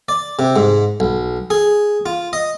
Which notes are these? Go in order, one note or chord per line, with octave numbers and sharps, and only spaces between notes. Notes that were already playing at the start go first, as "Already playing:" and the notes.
D5
C3
G#2
B1
G#4
F4
D#5